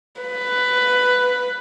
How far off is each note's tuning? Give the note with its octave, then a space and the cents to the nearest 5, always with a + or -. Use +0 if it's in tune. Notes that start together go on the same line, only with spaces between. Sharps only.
B4 +10